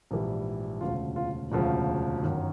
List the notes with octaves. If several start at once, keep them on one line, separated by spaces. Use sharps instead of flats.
A#1 G#2 E3 G3
E1 D2 C#3 F3 F4
F4
E1 D2 C#3 F3
G1 F#2 D#3 F#3